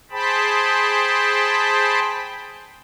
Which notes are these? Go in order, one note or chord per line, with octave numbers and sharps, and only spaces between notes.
G#4 C5 G5 A5 B5